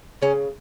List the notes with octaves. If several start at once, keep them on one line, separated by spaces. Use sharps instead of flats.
C#3 C#4